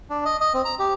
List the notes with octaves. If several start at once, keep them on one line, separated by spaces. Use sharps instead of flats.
D4
D#5
D#5
C4
A#5
G4